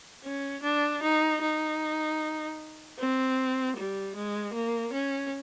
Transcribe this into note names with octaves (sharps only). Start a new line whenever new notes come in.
C#4
D4
D#4
D#4
C4
G3
G#3
A#3
C#4